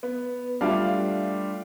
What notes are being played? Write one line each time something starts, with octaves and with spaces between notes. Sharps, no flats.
B3
G3 A3 D4 F4 F5